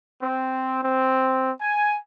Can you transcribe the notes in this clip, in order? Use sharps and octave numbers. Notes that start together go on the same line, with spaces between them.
C4
C4
G#5